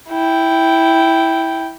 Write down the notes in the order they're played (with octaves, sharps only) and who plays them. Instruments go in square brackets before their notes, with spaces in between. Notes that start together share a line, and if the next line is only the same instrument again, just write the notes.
[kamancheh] E4 G5